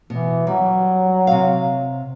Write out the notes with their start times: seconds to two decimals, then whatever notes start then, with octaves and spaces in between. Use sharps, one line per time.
0.10 B2 E3
0.47 F#3 G3
1.27 C3 F5